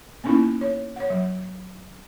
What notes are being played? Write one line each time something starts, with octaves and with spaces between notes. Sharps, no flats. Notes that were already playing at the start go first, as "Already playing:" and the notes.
A#3 B3 C#4 D#4 E4
C#5
C#5 F#5
F#3